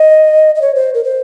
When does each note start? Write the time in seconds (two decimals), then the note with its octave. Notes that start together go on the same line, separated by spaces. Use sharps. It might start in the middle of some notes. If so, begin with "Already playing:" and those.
Already playing: D#5
0.55 D#5
0.62 C#5
0.75 C5
0.94 A#4
1.04 C5